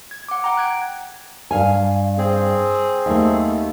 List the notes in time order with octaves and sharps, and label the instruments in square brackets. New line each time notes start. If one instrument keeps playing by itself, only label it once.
[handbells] G#6
F#5 D6
F#5 G5 A#5
F#6 G#6 D7
[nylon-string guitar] G2 F5 G#5
[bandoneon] C4 G#4
[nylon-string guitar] D#2 A3